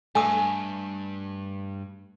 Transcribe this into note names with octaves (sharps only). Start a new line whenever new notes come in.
G2 A3 G#5 D#6